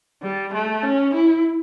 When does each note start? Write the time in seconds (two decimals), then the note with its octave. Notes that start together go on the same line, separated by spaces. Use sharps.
0.22 G3
0.53 A3
0.83 C#4
1.14 E4